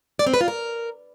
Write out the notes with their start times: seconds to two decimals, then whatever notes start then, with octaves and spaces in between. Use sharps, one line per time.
0.19 D5
0.26 C4
0.34 B4
0.41 F4
0.48 A#4